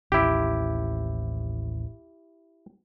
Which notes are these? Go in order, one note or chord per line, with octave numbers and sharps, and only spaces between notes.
A1 D#2 E4 G4